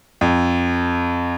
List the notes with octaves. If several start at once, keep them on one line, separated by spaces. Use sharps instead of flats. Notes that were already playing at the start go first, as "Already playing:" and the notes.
F2